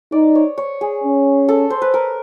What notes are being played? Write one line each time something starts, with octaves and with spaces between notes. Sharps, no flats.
D#4 D5
C#5
C#5
G#4
C#4
A4
C5
B4
A#4